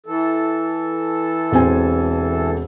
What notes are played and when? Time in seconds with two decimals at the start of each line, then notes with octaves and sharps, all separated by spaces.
0.06 E3 A4
1.52 E1 C4 G#5